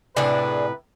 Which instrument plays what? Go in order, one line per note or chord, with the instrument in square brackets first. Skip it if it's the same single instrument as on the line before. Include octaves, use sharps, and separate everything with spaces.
[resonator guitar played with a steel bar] A2 C3 [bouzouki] D4 G#4 A4 [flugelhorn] B4